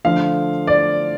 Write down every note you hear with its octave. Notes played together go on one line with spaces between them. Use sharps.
D3 F3 A3 F5
D5